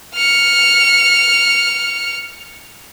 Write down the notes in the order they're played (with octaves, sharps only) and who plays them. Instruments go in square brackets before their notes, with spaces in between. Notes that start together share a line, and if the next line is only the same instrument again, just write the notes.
[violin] F6 C#7